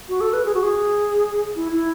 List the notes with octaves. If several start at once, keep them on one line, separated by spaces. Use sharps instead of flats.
F#4
A4
B4
G#4
F#4
G#4
E4
E4